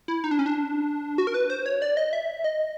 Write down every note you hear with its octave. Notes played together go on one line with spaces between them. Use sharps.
E4
D#4
D4
C#4
D4
F#4
A#4
B4
C5
C#5
D5
D#5
E5
D#5